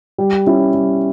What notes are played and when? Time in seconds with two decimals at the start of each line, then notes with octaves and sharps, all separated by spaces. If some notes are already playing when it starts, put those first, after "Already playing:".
0.18 G3
0.46 C#4 E4
0.74 G3